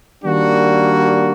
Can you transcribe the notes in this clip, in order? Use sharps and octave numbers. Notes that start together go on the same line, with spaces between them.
D#3 G3 A#3 D4 F#4